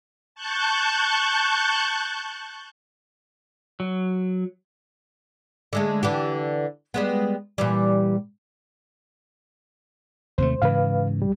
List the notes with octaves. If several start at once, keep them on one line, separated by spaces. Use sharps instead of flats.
A5 C#6 F#6 G6
F#3
D3 G#3 A3
D3 E3 G4
G3 G#3 B3
A#2 E3 G3
D#2 C3 A3 C5
G#2 C#3 E3 B4 F5
C2 G3